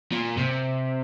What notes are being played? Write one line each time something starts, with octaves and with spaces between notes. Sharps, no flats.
A#2
C3